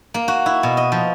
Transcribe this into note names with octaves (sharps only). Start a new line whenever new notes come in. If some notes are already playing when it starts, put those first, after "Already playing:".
A#3
F#4
E4
B2
D#5
F3